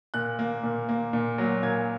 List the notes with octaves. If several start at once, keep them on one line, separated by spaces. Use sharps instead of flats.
A#2 F#6
A#3
A#2
A#3
A#2
F#3 A#3
A#2 G#6